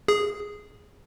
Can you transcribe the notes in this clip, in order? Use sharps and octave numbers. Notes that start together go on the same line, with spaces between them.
G#4